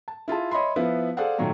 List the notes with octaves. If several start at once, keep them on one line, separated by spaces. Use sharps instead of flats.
A5
E4 F4 G#4 A5
C#5 D#5 E5 B5 C6
F3 B3 E4 B4 F5
G#4 A4 C5 D5 F5 F#5
A#2 D#3 F#3 A3 A#3